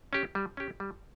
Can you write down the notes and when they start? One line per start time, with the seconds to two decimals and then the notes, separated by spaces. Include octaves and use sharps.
0.13 C#4 G4
0.35 G3
0.57 C#4 G4
0.80 G3